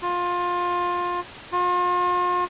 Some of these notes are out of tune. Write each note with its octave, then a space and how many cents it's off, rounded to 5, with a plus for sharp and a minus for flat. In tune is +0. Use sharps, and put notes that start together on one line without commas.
F4 +20
F4 +40